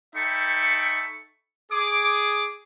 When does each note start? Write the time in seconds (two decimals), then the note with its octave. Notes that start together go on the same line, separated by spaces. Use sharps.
0.16 D#4 A4 E5 G5 B5 C#6
1.71 G#4 D6